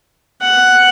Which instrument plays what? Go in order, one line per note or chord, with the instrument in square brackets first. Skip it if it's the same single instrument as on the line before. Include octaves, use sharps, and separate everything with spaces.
[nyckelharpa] F#5